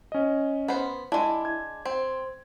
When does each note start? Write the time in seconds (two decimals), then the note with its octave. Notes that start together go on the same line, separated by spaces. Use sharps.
0.12 C#4 D#5
0.68 B3 C5
1.12 G#3 D4 E4
1.45 G#6
1.85 C4